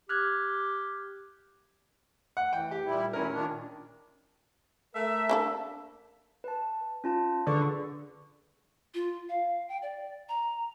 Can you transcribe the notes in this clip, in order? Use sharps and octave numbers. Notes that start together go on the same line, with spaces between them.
G4 F6 F#6 G#6
F#5
E3 G5
G4
A#2 G3 E4
E2 A#2 C#4 E4 A#4
A#2 D#3 D4
A3 A#4 E5
A#3 D4 A4
B4 A5
C#4 F4 A5
D3 G#4 B4 C#6
F4
F5
G5
D5
A#5